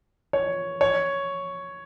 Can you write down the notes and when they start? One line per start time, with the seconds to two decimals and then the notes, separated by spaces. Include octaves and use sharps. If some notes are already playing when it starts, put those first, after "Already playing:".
0.33 C#5
0.81 C#5